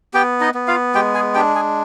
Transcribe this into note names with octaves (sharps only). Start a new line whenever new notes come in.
B3 G4 G5
D#4 D#5
B3
F4 F5
G#3 G4 G5
G#4 G#5
D4 G4 G5
G#4 G#5